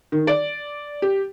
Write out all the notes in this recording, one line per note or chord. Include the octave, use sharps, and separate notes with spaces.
D#3
D5
G4